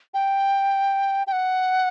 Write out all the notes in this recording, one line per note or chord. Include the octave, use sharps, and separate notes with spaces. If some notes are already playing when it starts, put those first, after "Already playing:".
G5
G5
F#5